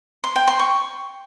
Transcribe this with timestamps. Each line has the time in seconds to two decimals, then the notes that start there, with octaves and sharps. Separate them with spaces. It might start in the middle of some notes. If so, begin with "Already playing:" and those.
0.24 C6
0.36 G5
0.48 C6
0.59 C#6